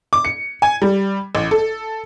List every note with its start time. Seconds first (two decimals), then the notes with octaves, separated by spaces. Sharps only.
0.13 D6
0.25 C#7
0.62 G#5
0.82 G3
1.35 A1
1.51 A4